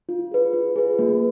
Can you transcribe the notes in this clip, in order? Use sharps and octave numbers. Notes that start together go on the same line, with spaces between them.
F4
G#4 B4
F4
G#4 B4
A#3